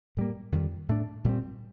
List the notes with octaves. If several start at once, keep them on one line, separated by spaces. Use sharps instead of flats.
A2 G3 A#3
F2 D#3 G3
A2 A3 D4
A#2 G3 C4